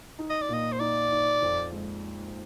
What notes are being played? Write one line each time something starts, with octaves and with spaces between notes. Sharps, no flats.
D#4
D#5
D5
A#2 D#5
C5
D#4 D5
D#4
F2
G#3